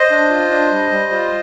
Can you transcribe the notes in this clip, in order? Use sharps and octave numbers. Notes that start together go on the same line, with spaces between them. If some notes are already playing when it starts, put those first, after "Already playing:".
Already playing: C5 D#5
D4
F4
D4
G3
G3
F4